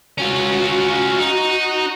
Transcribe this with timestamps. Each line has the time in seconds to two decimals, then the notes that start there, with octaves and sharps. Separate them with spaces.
0.18 C#4 F4 F#4
1.20 D#4